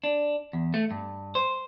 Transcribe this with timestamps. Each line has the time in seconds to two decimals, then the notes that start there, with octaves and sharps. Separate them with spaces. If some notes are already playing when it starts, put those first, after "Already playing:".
0.04 D4
0.53 E2
0.74 A3
0.91 G2
1.35 C5